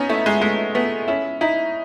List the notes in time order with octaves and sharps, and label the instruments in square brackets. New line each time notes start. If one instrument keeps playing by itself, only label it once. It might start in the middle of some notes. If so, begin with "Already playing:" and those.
Already playing: [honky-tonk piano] B3 C#4 D#4
[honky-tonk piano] A3 [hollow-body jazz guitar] E4
[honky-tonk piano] G#3
[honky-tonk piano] G#3 [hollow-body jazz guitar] A3
[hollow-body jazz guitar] A3 [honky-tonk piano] B3
[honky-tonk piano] C#4 [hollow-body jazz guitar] E4
[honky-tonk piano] D#4 [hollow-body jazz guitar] E4